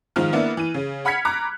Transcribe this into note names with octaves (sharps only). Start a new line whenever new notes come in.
G#2 D#3 F3 F4 F6
A#3 B3 D4 E4
E3 D#7
C#3
F#5 B5 F6 G#6 B6 C#7
A#5 B5 D6 F#6